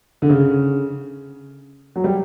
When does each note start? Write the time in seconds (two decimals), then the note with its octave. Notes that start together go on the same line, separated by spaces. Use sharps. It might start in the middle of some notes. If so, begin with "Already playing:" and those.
0.22 D3
0.30 C#3
1.96 F#3
2.04 G3